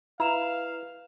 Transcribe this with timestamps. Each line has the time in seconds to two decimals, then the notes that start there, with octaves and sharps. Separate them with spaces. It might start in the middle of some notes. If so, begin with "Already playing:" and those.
0.20 E4 B4 F5 A#5 E7 F7